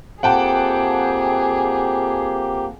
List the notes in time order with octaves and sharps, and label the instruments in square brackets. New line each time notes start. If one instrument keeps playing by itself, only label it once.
[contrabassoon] F2 [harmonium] A#3 G4 [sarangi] G#4 [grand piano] F#5 G5 A5